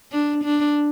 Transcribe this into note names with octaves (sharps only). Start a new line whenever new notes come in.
D4
D4